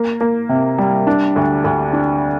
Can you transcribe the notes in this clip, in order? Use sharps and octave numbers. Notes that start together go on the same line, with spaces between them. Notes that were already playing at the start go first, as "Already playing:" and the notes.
Already playing: A#3
A#3
C3
G3
D4
D2
D2
D4